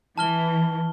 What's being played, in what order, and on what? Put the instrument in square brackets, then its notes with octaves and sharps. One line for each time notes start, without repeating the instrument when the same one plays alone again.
[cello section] E3 [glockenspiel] A5 F6 G7